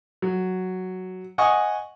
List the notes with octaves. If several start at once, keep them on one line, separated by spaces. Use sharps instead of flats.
F#3
D#5 F#5 G#5 C#6 D#6